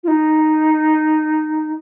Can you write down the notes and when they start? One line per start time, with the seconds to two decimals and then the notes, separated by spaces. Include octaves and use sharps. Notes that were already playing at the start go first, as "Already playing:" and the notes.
0.04 F4
0.08 D#4